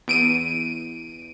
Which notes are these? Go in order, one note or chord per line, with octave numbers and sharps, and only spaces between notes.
E2 D7 D#7